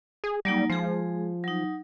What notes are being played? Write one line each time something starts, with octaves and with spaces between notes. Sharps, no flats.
G#4
F#3 G3 A#3 D#4
F3 G#3 G#4
F#3 D#4